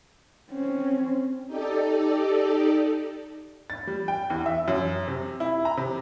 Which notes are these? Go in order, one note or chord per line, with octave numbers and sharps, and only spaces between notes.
C4 C#4
D#4 G4 A4 D5
A6
G3
G5
E2
E5
F#2
C3
E4
A#5
C3